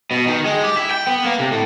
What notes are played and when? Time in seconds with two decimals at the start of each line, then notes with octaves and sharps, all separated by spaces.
0.11 B2
0.27 D#3
0.46 G#3
0.64 G4
0.77 E4
0.91 G5
1.07 B3
1.25 A#3
1.39 C3
1.51 A2